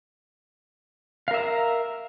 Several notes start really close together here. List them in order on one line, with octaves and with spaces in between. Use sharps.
F5 A#4 E5 A#5